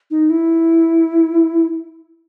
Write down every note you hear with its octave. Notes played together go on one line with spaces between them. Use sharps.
D#4
E4